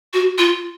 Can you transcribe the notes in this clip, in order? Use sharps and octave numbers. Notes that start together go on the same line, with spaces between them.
F#4
F4